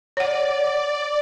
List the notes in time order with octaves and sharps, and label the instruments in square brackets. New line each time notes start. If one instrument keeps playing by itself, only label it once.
[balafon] C#5 F#5 [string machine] D5